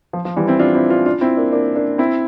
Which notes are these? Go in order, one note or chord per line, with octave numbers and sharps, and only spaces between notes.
F3
F3
E3 G3
C4 E4
D4 F4
C4 E4
D4 F4
D4 F4
C4 E4
A#3 D4
A#3 D4
A#3 D4
C4 E4